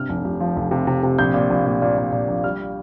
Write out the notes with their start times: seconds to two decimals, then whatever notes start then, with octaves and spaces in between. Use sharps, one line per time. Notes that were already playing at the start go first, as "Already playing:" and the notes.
Already playing: G2 C3 F6
0.09 F1
0.25 F1
0.40 F3
0.56 F1
0.71 C3
0.87 C3
1.03 C3
1.18 A#1 G6
1.34 A#2
1.50 A#1
1.66 A#2
1.82 A#2
1.98 A#2
2.12 A#2
2.28 A#1
2.44 G3 F6